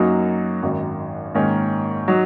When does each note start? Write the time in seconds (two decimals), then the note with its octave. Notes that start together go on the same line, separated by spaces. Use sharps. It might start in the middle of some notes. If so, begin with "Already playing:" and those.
Already playing: F#2 F#3 A#3 D#4 F#4
0.63 G#1 F#2 D#3
1.34 G#2 D#3 A#3 C#4
2.08 F#3 D#4 F#4